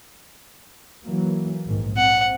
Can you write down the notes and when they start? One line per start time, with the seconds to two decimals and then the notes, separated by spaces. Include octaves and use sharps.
1.04 E3 F#3 A#3
1.66 A#1 G#2 D#3
1.97 C4 F#5